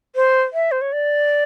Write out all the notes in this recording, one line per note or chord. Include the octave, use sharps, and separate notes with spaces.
C5
E5
C5
C#5
D5